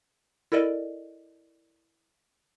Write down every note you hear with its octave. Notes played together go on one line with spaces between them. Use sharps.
E4 A4 A#4 D5 D#5